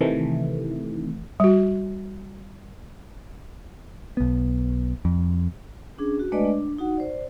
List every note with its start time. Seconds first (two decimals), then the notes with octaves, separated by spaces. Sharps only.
0.01 C3 D#3 E3 A3
1.40 G3 F#4
4.17 B1 B3
5.05 F2
5.98 C#4 D4 G#4
6.19 F#4
6.32 G#3 A3 D4 B4 D5 D#5
6.44 D4
6.78 D#4 F#4 F#5
6.97 C5 D5